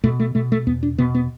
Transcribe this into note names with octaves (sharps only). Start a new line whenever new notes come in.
B2 A3
A3
B2 A3
A3
E2 B3
D4
B2 B3
B3